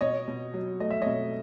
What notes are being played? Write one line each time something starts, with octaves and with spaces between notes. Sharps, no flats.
B2 C#5 D#5
B2
F#3
A3 D#5
E5
B2 C#5 D#5